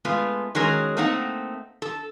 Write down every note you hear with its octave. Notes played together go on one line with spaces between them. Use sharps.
G#3 A3 B3 F4
D#3 F#3 G#3 C#4 G#4 A#4
A3 A#3 C4 D#4 F#5
A4